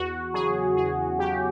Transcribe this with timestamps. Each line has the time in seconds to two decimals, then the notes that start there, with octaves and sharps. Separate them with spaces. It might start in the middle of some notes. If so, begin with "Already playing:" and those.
Already playing: E2 F#4
0.34 C#3 F#3 G#4
0.76 E2 G#4
1.19 C#3 F#3 G4